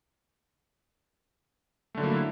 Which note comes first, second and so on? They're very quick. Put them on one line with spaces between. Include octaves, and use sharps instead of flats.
A3 D3 F#3 A#3 E4